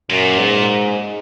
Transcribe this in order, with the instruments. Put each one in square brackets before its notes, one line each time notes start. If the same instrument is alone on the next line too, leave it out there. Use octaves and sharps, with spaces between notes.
[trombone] F#2 [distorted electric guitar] A#2
[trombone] G#2